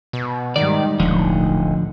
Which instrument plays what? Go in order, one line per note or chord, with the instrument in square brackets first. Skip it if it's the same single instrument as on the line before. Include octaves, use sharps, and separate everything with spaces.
[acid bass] B2
[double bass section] G#2 G3 [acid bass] D#3 [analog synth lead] D#4 [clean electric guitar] D5
[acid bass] D1 [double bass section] B1 A2 [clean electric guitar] D3 F3